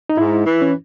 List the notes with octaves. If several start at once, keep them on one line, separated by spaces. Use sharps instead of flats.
D#4
G#2 E4
E3
C#4